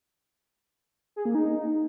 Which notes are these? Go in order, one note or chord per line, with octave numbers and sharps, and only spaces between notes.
G#4
A#3
D#4